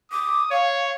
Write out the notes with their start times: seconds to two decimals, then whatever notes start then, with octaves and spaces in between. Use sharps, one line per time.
0.12 D6 D#6
0.51 C#5 F5